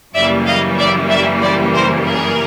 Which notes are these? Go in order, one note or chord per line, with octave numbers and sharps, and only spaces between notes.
F#2 C#3 E3 G3 A#3 D5 E5
D#5 F5
D5 E5
D5 E5
C5 D5
A#4 C5
G#4 A#4